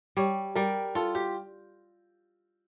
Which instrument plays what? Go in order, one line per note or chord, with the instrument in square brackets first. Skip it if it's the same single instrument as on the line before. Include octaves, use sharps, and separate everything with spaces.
[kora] G3 [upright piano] C#5
[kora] G3 [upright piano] A#4
[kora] F4 [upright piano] A4
[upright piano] G4